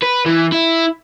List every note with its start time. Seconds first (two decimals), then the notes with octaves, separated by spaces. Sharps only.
0.03 B4
0.26 E3
0.52 E4